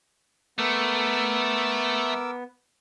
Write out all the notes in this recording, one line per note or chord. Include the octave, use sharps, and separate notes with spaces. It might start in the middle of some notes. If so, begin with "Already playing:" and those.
A3 B3 A#4 D6 E6